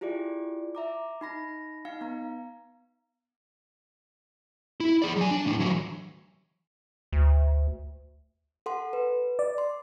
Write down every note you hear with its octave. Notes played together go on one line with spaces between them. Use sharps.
E4 F4 G4 G#4 D5
E5 A#5 D6
D#4 B5 A#6
D#4 F5 C#7
B3 A#5
E4
G#4 D5
F#3 G#5
D4
A2 D4
E3 F#3
D2
A4 F#5 C6
B4
D5
C6